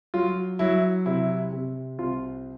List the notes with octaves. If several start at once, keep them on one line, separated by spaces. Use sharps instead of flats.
F#3 F4
F#3 E4
C3 E4
C3
C2 F4